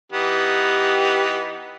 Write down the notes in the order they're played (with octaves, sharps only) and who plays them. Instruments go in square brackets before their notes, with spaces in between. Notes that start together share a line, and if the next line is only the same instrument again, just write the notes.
[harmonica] E3 B3 D#4 [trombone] G4